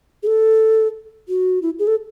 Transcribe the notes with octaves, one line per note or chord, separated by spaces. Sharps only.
G#4
A4
F#4
E4
G#4
A4